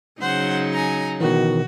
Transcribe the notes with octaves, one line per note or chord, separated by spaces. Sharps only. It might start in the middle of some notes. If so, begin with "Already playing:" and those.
C#3 F#3 D#4 C5 F#5
G#5 A#5
B2 D#3 E3 F#4